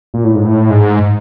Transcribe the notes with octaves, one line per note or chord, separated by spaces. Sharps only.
A#2
A2
G#2
A2
G#2